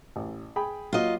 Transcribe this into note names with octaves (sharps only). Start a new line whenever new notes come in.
A1
G#4 G5 B5
F#3 A#3 F4 D#5